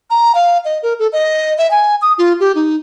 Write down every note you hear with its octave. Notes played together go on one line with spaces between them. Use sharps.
A#5
F5
D#5
A#4
A4
D#5
E5
G#5
D#6
F4
G4
D#4